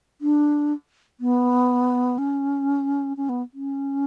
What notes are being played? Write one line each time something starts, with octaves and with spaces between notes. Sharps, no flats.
D4
B3
C#4
C#4
B3
C#4